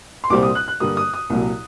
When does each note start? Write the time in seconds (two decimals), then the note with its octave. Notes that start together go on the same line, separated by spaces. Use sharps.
0.24 C6
0.30 C2 A#2 G3 C4 D6
0.43 D#6
0.55 F#6
0.68 F#6
0.80 G2 D3 G3 A#3 D#6
0.97 D#6
1.14 D#6
1.30 C2 A#2 F#3